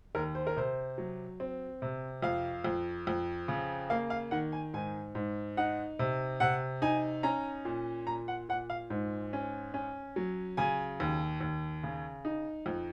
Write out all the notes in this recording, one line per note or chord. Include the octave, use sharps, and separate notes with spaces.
D#2 A#4
C5
A#4
C3 C5
F#3
C4
C3
F2 F5
F2
F2
C#3
A#3 F5
F5
D#3 F#5
G#5
G#2 G#5
G#2
D#4 F#5
C3
C3 F#5
D#4 G#5
C#4 A#5
A#2
A#2 A#5
F#5
A#2 F#5
F5
G#2
C#4
C#4
F#3
C#3 G#5
D#2
D#2
C#3
D#4
F2